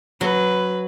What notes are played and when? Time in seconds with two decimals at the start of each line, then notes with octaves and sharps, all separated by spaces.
0.21 F#3 B4